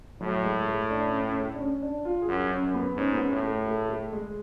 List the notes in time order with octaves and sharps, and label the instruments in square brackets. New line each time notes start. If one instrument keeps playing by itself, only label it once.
[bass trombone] A2 [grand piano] F#3
[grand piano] G#3
A3
D4
C#4
C#4
A3
D4
C#4
D4
F4
G#4
[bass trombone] F#2 [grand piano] F#4
[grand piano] C#4
[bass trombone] F#2
[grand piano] B3
[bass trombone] G#2 [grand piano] C#4
[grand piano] B3
C#4
[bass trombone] A2
[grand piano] A3
A3
A3
G#3